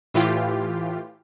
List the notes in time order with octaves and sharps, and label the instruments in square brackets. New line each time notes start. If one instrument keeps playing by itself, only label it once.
[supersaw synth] A2 E3 F4 G4